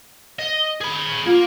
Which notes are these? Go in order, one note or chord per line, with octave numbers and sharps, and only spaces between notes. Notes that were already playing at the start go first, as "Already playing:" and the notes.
D#5
G#4 B5
A#3 F4